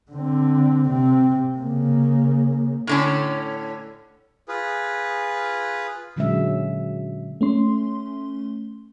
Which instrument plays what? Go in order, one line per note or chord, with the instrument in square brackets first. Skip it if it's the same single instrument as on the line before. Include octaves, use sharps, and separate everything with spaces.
[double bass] D3 C4
C3 C4
C#3 A#3
[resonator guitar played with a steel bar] A2 D3 C#4
[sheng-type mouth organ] F4 G#4 B4
[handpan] A#2 D3 F#3 G#3 C#4 E5
[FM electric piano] A3 C#4 C6